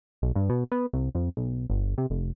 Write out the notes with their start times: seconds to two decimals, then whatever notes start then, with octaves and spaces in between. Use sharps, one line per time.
0.22 B1
0.36 G2
0.49 B2
0.72 B3
0.93 C2
1.15 F2
1.37 B1
1.70 G1
1.98 C3
2.10 F1